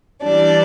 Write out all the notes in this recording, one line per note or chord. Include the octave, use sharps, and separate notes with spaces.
E3 G3 D4 D5